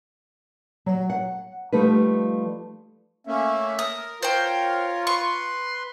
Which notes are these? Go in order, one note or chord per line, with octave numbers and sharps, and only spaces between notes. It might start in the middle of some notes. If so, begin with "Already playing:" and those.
F#3
F#5
F3 G3 A3 D#4 G4 B4
A3 A#3 C#4 E5
A#4 D#6
F4 A#4 C5 C#5 G5
B4 C6 C#6